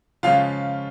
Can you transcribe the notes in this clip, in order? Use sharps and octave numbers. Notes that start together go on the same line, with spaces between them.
C#3 F3 G#3 C#4 F4 F5